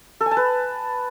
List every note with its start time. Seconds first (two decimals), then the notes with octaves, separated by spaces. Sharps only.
0.21 A4
0.26 G#5
0.31 A5
0.37 B4